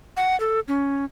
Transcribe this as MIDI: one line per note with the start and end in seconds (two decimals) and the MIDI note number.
0.17 0.38 78
0.40 0.60 69
0.68 1.05 61